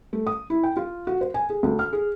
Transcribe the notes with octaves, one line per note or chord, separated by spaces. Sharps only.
A3
D#6
E4
G5
F4
F#4
C5
G#5
G#4
D2
F6
G#4